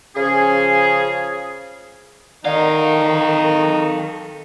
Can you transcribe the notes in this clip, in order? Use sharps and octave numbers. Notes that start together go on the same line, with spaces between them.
C#3 F3 C#4 G#4
D#3 D#4 A4 D5 F5 F#5